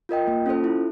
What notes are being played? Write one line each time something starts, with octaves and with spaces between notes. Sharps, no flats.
F4 A#4 D#5 G5
A#3
C#4 F4 A4 C5
E4